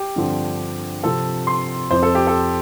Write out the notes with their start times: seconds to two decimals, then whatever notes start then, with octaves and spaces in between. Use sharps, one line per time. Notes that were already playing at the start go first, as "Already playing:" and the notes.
Already playing: G4
0.16 G2 D3 F3 C4
1.03 C3 F3 C4 A4
1.47 C6
1.91 F2 F3 C4 C5
2.03 A4
2.15 G4
2.27 A4